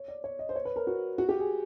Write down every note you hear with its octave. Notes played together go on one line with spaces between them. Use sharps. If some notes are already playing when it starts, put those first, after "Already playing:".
Already playing: C#5
D5
C#5
D#5
C5
C#5
B4
A#4
F#4
F#4
G4
G#4